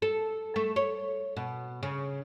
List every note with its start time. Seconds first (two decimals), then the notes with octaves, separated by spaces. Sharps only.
0.02 A4
0.56 A3
0.76 C#5
1.37 B2
1.83 C#3